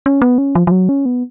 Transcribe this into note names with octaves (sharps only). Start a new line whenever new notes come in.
C#4
B3
C#4
F3
F3
F#3
C#4
B3